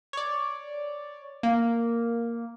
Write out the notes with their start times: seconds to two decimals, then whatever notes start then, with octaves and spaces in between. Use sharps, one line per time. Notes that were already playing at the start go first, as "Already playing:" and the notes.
0.13 C#5 D5
1.43 A#3